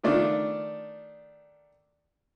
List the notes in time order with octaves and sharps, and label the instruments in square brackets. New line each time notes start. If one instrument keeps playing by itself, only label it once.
[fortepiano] D#3 A3 D4 F4